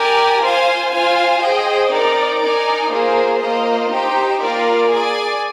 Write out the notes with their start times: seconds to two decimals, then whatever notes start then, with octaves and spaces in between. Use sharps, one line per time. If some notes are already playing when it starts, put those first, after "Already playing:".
Already playing: G4 A#4 D5 G#5
0.42 F4 C5 F5 G#5
0.91 F4 C5 F5 G#5
1.41 G#4 C5 D#5 G5
1.91 C4 D#4 A#4 D5
2.41 D#4 A#4 D5 G#5
2.90 A#3 F4 G#4 C5
3.40 A#3 F4 C5 D#5
3.91 D#4 G4 C5 G5
4.40 A#3 F4 A#4 D5
4.90 G#4 D5 G#5